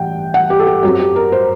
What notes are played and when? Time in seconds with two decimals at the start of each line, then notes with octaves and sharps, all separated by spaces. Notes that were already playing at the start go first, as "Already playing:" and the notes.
Already playing: A1 G2 F#5 G5
0.34 F#5
0.50 G4
0.60 A4
0.67 G4
0.83 F#2 F#3 C4 G4
0.99 G4
1.16 A#4
1.32 C5